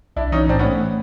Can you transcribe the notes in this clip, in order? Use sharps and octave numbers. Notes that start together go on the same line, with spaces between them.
B1 D4 E4
E3 C#4 D#4
A2 C4 D4
B3 C#4
A3